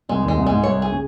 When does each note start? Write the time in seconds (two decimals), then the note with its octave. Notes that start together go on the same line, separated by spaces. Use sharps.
0.09 C2 C3 G#3
0.23 D#2 D#3
0.28 G#3
0.36 C2 C3
0.47 G#2 G#3
0.64 C2 C3 C#5
0.82 G#4
0.92 C#3